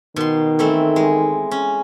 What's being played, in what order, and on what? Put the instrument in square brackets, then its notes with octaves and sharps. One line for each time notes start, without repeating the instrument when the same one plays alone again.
[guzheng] B2 C6 [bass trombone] D#3
[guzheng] E3 A3 C4
G#3
C#4